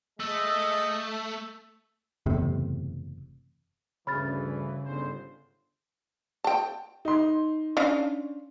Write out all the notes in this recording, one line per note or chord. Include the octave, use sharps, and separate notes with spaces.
G#3 A3 D#5 E6
F#1 E2 A2 C3
D2 G2 C#3 E3 B5 F6 A6
G1 G#2 C5
G5 A5
D#4 C6
C#4 D4 F5